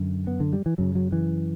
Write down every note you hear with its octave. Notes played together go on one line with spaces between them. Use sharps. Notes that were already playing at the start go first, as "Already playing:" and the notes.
Already playing: F#2 D3
B3
D3
G3
E3
F#2 C#3 F#3
F#3
E3